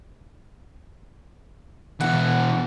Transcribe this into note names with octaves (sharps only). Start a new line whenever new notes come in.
B2 E3 F#5